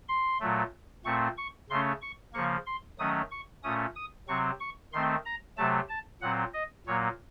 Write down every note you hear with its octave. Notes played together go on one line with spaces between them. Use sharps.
C6
A#2 F#3 A3
A#2 A3 C4 C#6
C#6
C#3 A3 C#4 C6
C#6
C#3 F3 A#3 C#6
C6
D#3 F#3 A3 C#4 D#6
C#6
A#2 A3 C#4 D#6
D#6
C3 F#3 C4 C#6
C#6
D#3 A3 C4 C6
A#5
C3 F#3 A3 A5
A5
A#2 F#3 C4 F#5
D#5
A#2 F#3 A#3 C#5